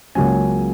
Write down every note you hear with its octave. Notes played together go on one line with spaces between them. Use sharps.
C#2 C#3 F#3 A#3 C#4 G#5